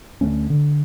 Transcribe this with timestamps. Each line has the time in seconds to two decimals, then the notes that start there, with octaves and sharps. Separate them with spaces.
0.21 D2 A3 C#4
0.50 D3